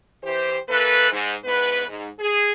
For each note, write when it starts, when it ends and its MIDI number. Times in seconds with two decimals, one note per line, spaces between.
0.23 0.57 52
0.23 0.57 67
0.23 0.57 72
0.69 1.11 52
0.69 1.11 58
0.69 1.11 69
0.69 1.11 71
1.12 1.32 44
1.45 1.87 40
1.45 1.87 44
1.45 1.87 59
1.45 1.87 71
1.88 2.07 44
2.20 2.52 68